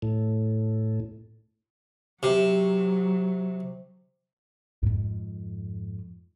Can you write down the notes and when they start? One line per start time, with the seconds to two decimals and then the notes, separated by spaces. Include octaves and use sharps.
0.02 A2
2.23 C3 F#3
4.83 F2 G#2